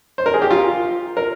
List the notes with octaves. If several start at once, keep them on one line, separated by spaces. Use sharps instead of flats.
C5
A#4
G#4
G4
F4
A#4